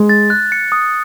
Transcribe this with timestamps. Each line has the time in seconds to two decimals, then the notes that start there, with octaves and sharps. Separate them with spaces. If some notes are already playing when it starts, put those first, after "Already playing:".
Already playing: G#3
0.09 A6
0.30 F#6
0.52 C#7
0.72 D#6